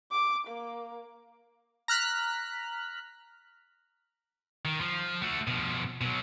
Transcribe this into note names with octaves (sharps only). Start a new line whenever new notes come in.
D6
A#3
A#5 F6 F#6 B6
D#3
F3
A3 F#4
B2 F3
B2 F#3